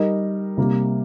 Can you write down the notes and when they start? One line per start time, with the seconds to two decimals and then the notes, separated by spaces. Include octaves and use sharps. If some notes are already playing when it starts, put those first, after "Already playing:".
Already playing: G3 D#4 A#4
0.57 C3 G3 A#3